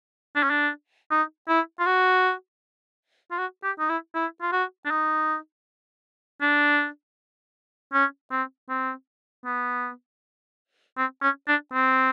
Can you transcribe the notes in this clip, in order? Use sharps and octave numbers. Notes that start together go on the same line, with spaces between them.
D4
C#4
D4
D#4
E4
F4
F#4
F4
F#4
G4
D#4
E4
E4
F4
F#4
D4
D#4
D4
C#4
C4
C4
B3
C4
C#4
D4
C4